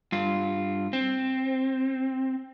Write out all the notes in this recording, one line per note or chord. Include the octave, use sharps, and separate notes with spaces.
G2 F4
C4